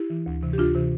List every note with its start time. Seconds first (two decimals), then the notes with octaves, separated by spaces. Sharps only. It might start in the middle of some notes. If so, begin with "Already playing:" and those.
Already playing: E4 G4
0.10 E3
0.26 D2
0.43 C3 E3
0.53 G4
0.58 D2 D4 F4
0.75 C3 E3